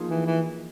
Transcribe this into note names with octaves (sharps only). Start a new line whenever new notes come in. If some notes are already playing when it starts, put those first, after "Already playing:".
Already playing: F3 A#3 D#4 G#4
E3
E3